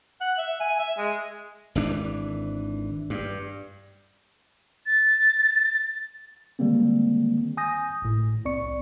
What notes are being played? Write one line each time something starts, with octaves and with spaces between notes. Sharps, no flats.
F#5
E5
G#5
E5
G#3
G#1 E3 D4
G2
A6
D3 D#3 G3 G#3 A#3 C4
G#5 D#6 G6 A#6
G#1 A2
C2 C4 D5 C#6 C#7